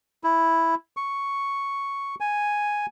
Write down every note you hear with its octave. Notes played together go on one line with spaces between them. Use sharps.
E4
C#6
G#5